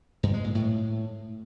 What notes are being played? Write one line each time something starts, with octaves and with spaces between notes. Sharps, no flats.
G2
G#3
A#2
A2